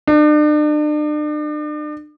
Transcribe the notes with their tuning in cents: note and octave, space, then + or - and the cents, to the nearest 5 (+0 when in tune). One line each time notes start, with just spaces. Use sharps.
D4 +40